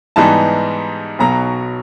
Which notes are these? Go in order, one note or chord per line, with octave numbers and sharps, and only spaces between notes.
G#2 E3 G3 B3 D#4 A5
B1 B2 F#3 A#5